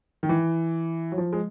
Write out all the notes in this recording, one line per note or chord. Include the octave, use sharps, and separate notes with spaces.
D#3
E3
F#3
F3
G#3